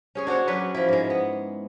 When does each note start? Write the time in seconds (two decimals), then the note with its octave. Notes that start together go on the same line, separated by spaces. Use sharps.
0.15 C#4 G#4 C#5
0.27 D4 F#4 C5 C#5
0.48 F#3 C#4 B4
0.75 F3 E4
0.89 G#2 G#3
1.10 B3